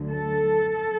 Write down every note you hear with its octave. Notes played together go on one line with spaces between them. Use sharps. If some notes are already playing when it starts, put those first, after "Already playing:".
Already playing: D2 D3 F#3
A4